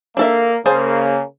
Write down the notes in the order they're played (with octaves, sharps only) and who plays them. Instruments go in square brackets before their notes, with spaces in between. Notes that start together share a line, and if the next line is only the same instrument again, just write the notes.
[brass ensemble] A#3 [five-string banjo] D4 A4 E5
[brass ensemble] C#3 A#3 [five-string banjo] G#4 C5 A5